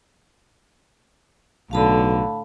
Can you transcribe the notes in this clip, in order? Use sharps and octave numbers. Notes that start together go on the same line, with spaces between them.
B1 A2 D3 F5 A5 B5